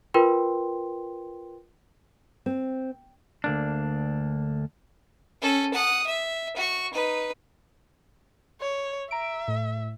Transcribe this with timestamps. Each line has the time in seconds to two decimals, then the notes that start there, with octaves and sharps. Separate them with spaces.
0.14 F4 A#4 B4 G5 C6
2.46 C4
3.44 D2 A#3 D4
5.42 C#4 A4
5.74 F#5 D#6
6.07 E5
6.56 F#4 C#6
6.94 D#4 B4
8.61 C#5
9.11 E5 A#5 D7
9.48 A2